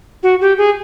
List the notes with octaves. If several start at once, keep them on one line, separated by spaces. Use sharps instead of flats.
F#4
G4
G#4